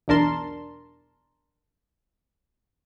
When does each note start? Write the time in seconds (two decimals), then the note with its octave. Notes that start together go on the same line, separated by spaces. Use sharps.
0.08 B1 E2 D4 A#4 A5 C6